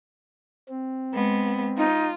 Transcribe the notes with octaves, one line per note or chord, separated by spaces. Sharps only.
C4
G#3 B3
D#4 F4